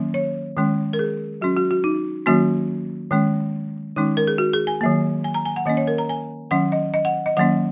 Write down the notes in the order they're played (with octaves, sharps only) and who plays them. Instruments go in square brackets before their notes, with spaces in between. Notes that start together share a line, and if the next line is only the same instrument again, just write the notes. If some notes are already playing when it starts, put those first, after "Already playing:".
Already playing: [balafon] D#3 F#3 A#3 C#4
C#5
D#3 G#3 C#4
A#4
G#4
F#3 C#4 F#4
F#4
F#4
D#4
D#3 F#3 A#3 C#4 F#4
D#3 G#3 C#4
D#3 G#3 C#4 D#4
A#4
G#4
F#4
G#4
G#5
D#3 F#3 A#3
G#5
A#5
G#5
F#5
D#3 A#3 C#4 D#5
C#5
A#4
A#5
G#5
D#3 F#3 C#4 F#5
D#5
D#5
F#5
D#5
D#3 F#3 A#3 C#4 F#5